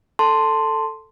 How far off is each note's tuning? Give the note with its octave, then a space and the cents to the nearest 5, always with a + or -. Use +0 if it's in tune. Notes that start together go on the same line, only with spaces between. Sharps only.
A4 +5 A5 +15 C6 +0